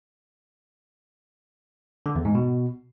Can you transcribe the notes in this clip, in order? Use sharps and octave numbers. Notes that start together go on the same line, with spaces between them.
D3
E2
G#2
B2